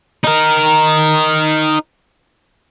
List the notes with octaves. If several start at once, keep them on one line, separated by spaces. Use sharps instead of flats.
D#4 A#4